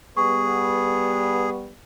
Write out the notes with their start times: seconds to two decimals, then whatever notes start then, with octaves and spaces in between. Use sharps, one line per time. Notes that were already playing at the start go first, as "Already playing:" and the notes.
0.17 G3 B3 G#4 C#6